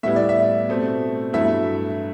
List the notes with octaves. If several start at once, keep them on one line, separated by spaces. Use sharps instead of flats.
A2 G3 B3 E4 E5
D5
E5
B2 A3 C4
G2 F#3 A3 E4 E5